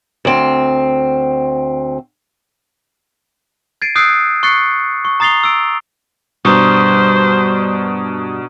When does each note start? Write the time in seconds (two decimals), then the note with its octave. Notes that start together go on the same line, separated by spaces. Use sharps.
0.25 D2 C4
3.82 G#6 A6 C7 D7 D#7
3.96 D#6 E6 F#6 G6 C7 D7
4.43 C#6 F#6 A6 C7 C#7
5.05 C#6
5.20 A#5 D#6 A6 C7 F7 G7
5.44 E6 D7
6.45 G2 B2 G3 D4 C5 A#5 C#6 D#6